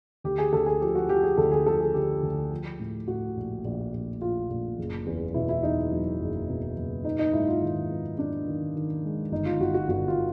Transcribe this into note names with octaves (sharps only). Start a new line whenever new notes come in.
D2 G4
G#4
D2 A4
G#4
F3 G4
F#4
F3 G4
G#4
D2 A4
G#4
F3 A4
G#4
D3 G4
D2
F3
A2
A2 F#4
A#1
A#1
A#1
A#1 F4
A#1
F#1
E2
B2 E4
E4
E2 D#4
F#3
F#1
B2
F#1
B3 D#4
D#4
G#2 E4
F4
D#3 E4
B3
B3 D4
D#3
D#3
G#3
G1 D#4
F4
G1 F#4
F#4
G1 F#4
F4